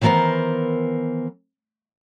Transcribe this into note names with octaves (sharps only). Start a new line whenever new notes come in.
D#3 E3 B3 A4 A#4 C5